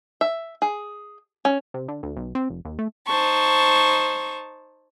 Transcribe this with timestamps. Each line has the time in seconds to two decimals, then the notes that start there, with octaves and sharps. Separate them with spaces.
0.21 E5
0.62 G#4
1.45 C#4
1.74 C3
1.88 D3
2.03 D2
2.17 B1
2.35 C4
2.50 F1
2.65 D#2
2.79 A3
3.07 D#4 C5 A5 C#6